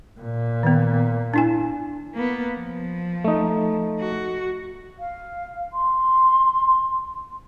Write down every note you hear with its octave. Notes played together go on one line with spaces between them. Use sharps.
A#2
D#3 B3
D4 E4 G#5
A#3 B3
F3
A3 D#4
F#4
F5
C6